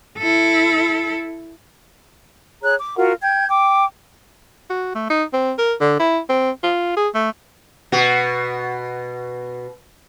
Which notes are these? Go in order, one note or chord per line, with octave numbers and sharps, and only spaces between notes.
E4 A4
G#4 C#5 A#5 F#6
D6
F4 F#4 A#4 F#5
G5 G6 G#6
G5 D6
F#4
A3
D#4
C4
A#4
D3
E4
C4
F4
G#4
A3
B2 F#4